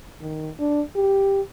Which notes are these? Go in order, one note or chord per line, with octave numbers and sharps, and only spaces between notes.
D#3
D4
G4